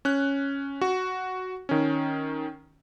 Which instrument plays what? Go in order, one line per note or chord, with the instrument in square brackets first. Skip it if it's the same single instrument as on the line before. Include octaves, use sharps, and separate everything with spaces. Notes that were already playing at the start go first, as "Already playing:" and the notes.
[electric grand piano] C#4 F#6
F#4
D#3 C#4